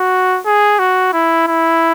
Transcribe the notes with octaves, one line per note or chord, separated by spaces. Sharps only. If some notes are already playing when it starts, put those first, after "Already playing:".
Already playing: F#4
G#4
F#4
E4
E4